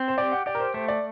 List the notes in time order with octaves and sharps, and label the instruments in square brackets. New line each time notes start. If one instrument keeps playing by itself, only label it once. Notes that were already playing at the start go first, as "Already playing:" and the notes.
Already playing: [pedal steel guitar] C4
[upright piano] C5
[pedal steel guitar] G4 [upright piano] D5
[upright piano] F#5
[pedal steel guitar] G4 [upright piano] D5
[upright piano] A#4
C5
[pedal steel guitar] A3 [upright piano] C5
[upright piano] D5